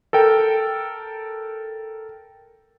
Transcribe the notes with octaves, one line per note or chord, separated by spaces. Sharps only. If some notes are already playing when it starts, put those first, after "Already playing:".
A4 A#4 G5